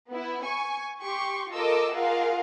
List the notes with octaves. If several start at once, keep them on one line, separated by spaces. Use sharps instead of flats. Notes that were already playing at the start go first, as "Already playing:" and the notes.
B3 E4
G#5 C#6
G4 C6 C#6
F4 A4 A#4 D#5 D6 E6
F4 G#4 A#4 F5 F#5